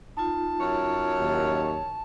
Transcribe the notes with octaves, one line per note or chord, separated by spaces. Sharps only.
D#4 F4 A5
F#2 C#5
D#2